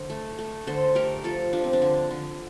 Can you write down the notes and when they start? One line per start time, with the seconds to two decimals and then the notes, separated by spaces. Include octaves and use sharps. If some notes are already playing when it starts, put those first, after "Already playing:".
Already playing: D3 C5
0.10 A3
0.39 A3
0.67 D3 A4 C5
0.95 A3 G4 A#4
1.24 F3 F4 A4
1.53 F3 D4
1.64 C4
1.73 D4
1.82 D3
2.11 D3